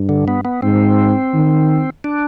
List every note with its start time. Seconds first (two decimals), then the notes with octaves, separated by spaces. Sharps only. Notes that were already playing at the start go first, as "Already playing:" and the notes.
Already playing: G2
0.09 D3
0.28 B3
0.45 B3
0.62 G#2 C4
1.34 D#3
2.04 D4